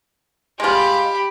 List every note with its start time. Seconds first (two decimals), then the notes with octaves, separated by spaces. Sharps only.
0.60 G#3 F4 G4 B5